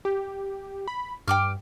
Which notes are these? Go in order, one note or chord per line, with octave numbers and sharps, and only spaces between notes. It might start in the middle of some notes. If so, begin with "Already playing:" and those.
G4
B5
G2 G5 D6 F6